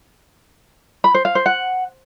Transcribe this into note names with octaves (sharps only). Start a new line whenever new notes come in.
B5
C5
F5
C5
F#5